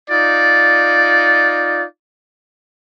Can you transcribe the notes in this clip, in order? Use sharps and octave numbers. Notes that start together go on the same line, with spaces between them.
D#4 F4 D5